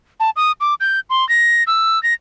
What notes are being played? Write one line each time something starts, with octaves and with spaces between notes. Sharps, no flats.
A5
D#6
D6
G6
C6
A#6
E6
A#6